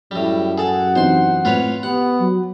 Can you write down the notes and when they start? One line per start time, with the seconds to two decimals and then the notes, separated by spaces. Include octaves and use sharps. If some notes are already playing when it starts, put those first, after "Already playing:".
0.11 F#2 A2 G3
0.58 G#4 A4 F#5 G#5
0.96 C3 E3 D#4 C5 C6
1.45 A2 C4 F4 B4 C#5
1.83 B3 G4 F#5
2.20 F#3